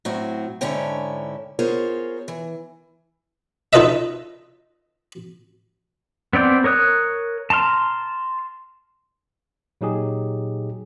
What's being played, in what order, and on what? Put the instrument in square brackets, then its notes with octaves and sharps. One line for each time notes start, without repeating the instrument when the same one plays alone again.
[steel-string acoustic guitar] A2 F#3 C4 F#4
G#2 D3 C#4 E4 C#5 G5
B3 F4 G#4 A#4 C5 C#5
E3
[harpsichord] D#4 F4 A4 B4 D#5 E5
[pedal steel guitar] B3 C4 D5 G5
A#4 C#5 D#6 F#6
A5 A#5 C6 F6
[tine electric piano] A#2 F#3 D#4 G4 G#4